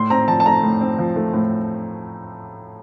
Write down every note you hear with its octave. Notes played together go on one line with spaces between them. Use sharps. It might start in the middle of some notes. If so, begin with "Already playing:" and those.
Already playing: A2 C6
C4 A#5
F3 A5
A5
A3 A#5
A2
C4
F3
A3
A2